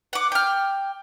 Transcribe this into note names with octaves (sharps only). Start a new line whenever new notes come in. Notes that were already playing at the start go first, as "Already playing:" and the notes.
F#5 D6
G5 F6